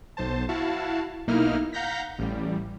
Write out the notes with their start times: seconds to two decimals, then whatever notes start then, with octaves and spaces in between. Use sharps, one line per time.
0.17 B1 C5 A5
0.49 E4 F#4 F5 A5
1.27 B1 A#3 D#4 E4 F6
1.73 F5 F#5 A#5 G6 A#6 B6
2.19 A1 G3